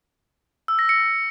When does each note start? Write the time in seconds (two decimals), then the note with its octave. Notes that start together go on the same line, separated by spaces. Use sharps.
0.68 E6
0.79 A#6
0.89 C#7